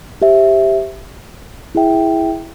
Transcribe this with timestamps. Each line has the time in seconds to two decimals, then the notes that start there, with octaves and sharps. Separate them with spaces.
0.22 G4 C5 E5
1.75 E4 G#4 E5 G5